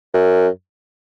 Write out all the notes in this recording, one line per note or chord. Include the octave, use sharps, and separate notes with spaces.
F#2